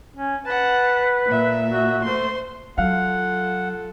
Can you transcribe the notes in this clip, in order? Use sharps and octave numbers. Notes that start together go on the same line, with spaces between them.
C#4
B4 F#5 A5
A#2 E5
F#4
A3 C5 C6
F#3 F4 A4 F5 F#5